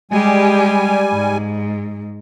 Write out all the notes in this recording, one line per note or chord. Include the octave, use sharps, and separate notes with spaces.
G3 G#3 G4 G#5
G#2